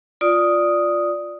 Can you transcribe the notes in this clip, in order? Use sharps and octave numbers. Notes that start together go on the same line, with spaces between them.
F4 D5 D#6